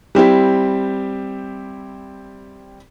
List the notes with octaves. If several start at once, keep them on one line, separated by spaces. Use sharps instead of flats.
G3 C4 E4 G4